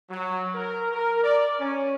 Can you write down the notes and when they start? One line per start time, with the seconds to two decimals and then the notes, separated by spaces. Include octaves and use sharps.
0.10 F#3
0.54 A#4
0.91 A#4
1.23 D5
1.59 C#4